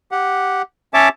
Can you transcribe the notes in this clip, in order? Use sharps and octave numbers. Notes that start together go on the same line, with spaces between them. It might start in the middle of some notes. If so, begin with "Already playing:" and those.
G4 F#5
C#4 C#5 E5 A5 D6